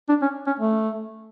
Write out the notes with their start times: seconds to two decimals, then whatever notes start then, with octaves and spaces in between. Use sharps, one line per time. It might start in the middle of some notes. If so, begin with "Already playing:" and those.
0.09 D4
0.22 C#4
0.47 C#4
0.60 A3